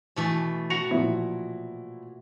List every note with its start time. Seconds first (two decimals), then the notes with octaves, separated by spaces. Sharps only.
0.16 B2 E3 A3
0.70 F#4 A#6 C#7 F7
0.91 A#2 F3 E4